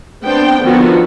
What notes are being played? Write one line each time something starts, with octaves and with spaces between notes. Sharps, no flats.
B3 C4 D4 C5 G5
D3 D#3 F3 B3 F#4